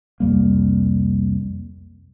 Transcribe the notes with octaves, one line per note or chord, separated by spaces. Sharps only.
C2 F2 G3 A#3